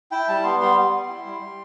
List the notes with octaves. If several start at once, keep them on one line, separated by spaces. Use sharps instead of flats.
E4 G5
G3 A5
B3 C6
G3 C6
B3
G3
E4
G3
G3